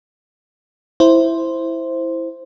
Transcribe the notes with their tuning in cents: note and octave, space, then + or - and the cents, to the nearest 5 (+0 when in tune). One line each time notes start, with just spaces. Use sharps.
E4 +0 C5 +0